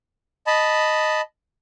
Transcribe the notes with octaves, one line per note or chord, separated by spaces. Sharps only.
D#5 A5 B5